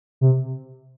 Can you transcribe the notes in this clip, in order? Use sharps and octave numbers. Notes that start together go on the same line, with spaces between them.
C3